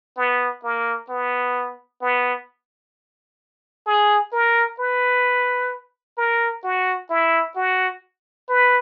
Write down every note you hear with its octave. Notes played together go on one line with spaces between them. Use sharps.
B3
A#3
B3
B3
G#4
A#4
B4
A#4
F#4
E4
F#4
B4